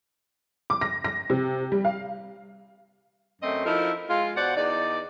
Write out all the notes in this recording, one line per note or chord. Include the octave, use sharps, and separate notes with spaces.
D6
A#6
A#6
C3
G3
F5
F#2 A3 C4 D#5
F3 D#4 E4 A4 A#4
G#3 F4
B2 C5 D5 F#5
E2 D#4 D5